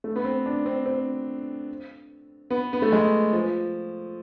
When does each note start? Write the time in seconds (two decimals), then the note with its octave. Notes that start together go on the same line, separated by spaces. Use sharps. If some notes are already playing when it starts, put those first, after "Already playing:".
0.04 A3
0.16 B3
0.25 C4
0.46 D4
0.66 C4
0.86 C4
2.51 B3
2.73 B3
2.82 A3
2.92 G#3
3.33 F3